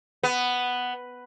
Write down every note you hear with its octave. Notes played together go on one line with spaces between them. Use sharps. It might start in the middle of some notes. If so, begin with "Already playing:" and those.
B3